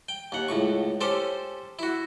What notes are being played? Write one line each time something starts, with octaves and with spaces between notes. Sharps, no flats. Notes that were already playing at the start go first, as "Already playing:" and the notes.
G5
D#2 F#5
C#2 A2 C#6
C#4 G4 A4 C5
E4 F#4